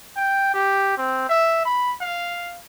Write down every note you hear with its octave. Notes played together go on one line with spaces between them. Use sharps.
G5
G4
C4
E5
B5
F5